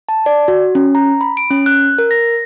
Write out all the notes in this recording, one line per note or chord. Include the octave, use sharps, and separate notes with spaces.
A5
D5
F#4
C#4
A#5
B5
D7
C#4
F#6
A#4
A#6